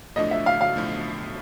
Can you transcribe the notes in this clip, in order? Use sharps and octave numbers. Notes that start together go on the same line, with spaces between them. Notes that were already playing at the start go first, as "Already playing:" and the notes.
B1 A2 F3 A3 D4 D#5
E5
F5
F5
B1 A2 F3 A3 D4